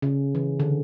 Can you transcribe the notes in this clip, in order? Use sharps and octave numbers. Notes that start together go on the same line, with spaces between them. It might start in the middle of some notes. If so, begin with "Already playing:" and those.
C#3
E3
D3